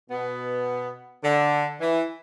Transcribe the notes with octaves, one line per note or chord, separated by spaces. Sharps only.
B2 B3
D3
E3